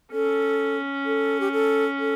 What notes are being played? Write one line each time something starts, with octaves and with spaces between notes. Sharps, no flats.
C#4 A4
A4
G4
A4
A4